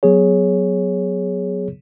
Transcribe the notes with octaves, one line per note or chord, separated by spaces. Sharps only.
F#3 B3 G#4 C#5